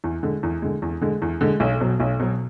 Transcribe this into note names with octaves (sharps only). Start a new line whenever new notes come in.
E2
D3 G#3
E2
D3 G#3
E2
D3 G#3
E2
D3 G#3
B1
B2 F#3
B1
B2 F#3